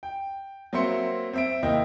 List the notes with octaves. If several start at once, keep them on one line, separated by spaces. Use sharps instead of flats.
G5
F#3 A#3 C4 E5 C6 C#7
C4 E5 D7
D#2 C3 A#3 E4 D#5 G5